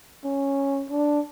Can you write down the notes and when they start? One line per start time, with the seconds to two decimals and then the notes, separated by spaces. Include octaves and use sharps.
0.24 C#4
0.91 D4